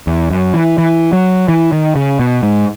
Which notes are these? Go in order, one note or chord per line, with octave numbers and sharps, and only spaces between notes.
E2
F#2
E3
E3
F#3
E3
D#3
C#3
B2
G#2